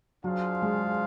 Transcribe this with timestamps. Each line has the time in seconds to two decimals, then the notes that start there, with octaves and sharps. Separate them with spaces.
0.24 F#3 D4 F4 G#4 C5 F5
0.62 G#3